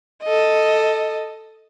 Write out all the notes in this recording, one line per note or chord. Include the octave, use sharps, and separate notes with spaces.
A4 D#5